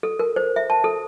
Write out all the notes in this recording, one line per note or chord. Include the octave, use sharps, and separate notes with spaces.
A4
A#4
C5
E5
A5
A4